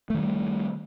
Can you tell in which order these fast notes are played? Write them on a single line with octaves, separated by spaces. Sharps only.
A3 D#3 G3